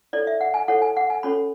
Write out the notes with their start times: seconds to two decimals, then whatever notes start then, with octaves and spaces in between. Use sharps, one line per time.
0.13 E4 A4 C#5 D5
0.27 E5
0.41 F#5
0.54 G#5
0.68 E4 A4 C#5 F#5
0.82 G#5
0.97 F#5
1.10 G#5
1.23 C#4 F#4 A4 C#5 B5